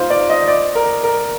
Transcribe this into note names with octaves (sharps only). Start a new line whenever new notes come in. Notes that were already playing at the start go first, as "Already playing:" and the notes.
Already playing: D#4 F4 C5
D5
D#5
D5
A#4
A#4